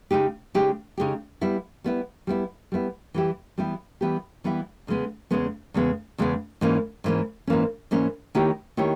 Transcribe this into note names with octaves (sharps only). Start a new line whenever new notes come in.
C#3 G#3 D#4 G4
C#3 G#3 D#4 G4
C#3 G#3 D#4 G4
G3 B3 E4
G3 B3 E4
G3 B3 E4
G3 B3 E4
E3 G3 B3 E4 G4
E3 G3 B3 E4 G4
E3 G3 B3 E4 G4
E3 G3 B3 E4 G4
E2 C#3 G#3 B3
E2 C#3 G#3 B3
E2 C#3 G#3 B3
E2 C#3 G#3 B3
G#2 E3 A#3 C#4
G#2 E3 A#3 C#4
G#2 E3 A#3 C#4
G#2 E3 A#3 C#4
D#3 A#3 E4 G4 C#5
D#3 A#3 E4 G4 C#5